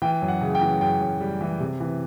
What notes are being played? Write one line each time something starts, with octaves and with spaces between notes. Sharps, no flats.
E3 G5
F#2
F#5
C#3
G5
E3
F#2 G5
F#2
G3
E3
C3
E3